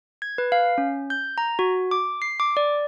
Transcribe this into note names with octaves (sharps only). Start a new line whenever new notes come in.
G#6
B4
F5
C#4
G6
A#5
F#4
D6
C7
D6
D5